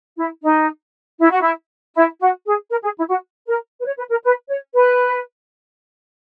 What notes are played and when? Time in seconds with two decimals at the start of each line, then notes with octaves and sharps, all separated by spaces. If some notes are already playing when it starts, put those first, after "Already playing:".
0.17 E4
0.43 D#4
1.20 E4
1.30 F#4
1.41 E4
1.95 E4
2.20 F#4
2.46 G#4
2.71 A#4
2.84 G#4
2.97 E4
3.09 F#4
3.48 A#4
3.81 B4
3.86 C#5
3.98 B4
4.11 A#4
4.24 B4
4.49 C#5
4.74 B4